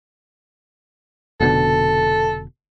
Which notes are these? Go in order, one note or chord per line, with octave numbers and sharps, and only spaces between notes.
F1 B2 D3 A4